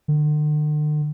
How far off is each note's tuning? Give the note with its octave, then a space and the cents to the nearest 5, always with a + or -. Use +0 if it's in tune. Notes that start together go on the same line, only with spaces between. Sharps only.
D3 +45